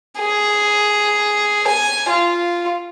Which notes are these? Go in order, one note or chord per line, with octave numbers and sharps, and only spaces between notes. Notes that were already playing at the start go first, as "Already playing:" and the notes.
G#4
G#5
F4